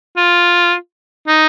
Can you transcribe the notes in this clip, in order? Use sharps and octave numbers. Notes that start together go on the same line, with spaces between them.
F4
D#4